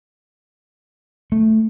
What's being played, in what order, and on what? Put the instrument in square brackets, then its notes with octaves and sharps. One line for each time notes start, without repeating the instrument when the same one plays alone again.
[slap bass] A3